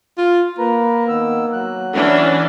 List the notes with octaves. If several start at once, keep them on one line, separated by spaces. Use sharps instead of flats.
F4
A#3 B4 A#5
D#3 B3 E6
F#3 F#6
E3 C#4 D4